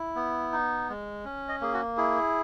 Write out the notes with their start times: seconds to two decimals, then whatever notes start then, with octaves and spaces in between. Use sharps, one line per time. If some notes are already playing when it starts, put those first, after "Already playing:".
Already playing: E4
0.16 B3
0.52 D#4
0.89 G#3
1.25 C#4
1.48 D#5
1.61 A#3 G#4
1.74 F#4
1.97 E4 G#4